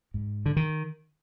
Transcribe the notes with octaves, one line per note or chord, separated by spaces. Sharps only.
G#2
D3
D#3